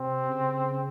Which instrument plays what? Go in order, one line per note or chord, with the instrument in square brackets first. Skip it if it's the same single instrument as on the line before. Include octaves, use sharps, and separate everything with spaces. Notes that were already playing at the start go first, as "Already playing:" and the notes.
Already playing: [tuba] C3 [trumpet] C4
[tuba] C#3